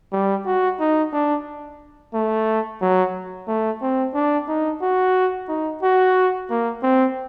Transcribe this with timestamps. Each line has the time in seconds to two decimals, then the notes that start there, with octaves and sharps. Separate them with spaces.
0.12 G3
0.46 F#4
0.80 D#4
1.13 D4
2.14 A3
2.81 F#3
3.48 A3
3.82 C4
4.14 D4
4.48 D#4
4.82 F#4
5.49 D#4
5.83 F#4
6.50 A#3
6.83 C4